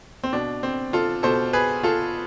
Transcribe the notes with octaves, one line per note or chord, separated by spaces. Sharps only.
C4
B2 D4
C4
F4 A4
B2 A4 C5
G#4 B4
F4 A4